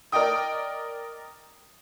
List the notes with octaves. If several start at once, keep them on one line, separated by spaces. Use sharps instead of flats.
A#4 D5 D#5 G5 D#6